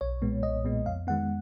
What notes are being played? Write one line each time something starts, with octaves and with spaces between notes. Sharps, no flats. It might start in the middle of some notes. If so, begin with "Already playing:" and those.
B1 C#5
A#2 G#3 B3
B1 D#5
A#2 G#3 B3
F2 F5
D#3 G#3 B3 F#5